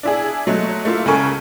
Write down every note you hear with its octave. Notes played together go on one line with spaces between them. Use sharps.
D4 E4 G#4
F#3 G#3 A3
A3 A#3 E4 F4
C#2 C#3 A4 A#4 G#5 C#6